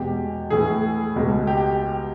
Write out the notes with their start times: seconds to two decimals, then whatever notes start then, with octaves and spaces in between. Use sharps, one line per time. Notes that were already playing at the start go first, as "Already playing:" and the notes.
Already playing: E2 B2 G#3 G4
0.50 A2 E3 A3 G#4
1.16 C#2 B2 G#3
1.47 G4